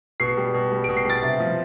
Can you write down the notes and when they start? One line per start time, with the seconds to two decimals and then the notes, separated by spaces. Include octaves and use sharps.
0.20 B2 C7
0.37 G3
0.54 B2
0.72 G3
0.84 B2 D7
0.97 C7
1.05 G3 A6
1.23 C3
1.40 F3